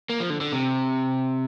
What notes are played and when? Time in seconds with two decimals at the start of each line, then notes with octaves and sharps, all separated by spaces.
0.10 A#3
0.20 F3
0.30 D3
0.41 D3
0.53 C3